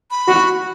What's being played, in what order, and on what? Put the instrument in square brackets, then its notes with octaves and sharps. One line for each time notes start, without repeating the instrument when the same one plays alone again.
[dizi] B5
[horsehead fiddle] F#4